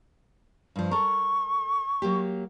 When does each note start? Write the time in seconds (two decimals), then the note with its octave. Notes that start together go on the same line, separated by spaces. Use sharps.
0.76 G2 F3
0.91 A4 A#4 C#6
2.02 F#3 A#3 G4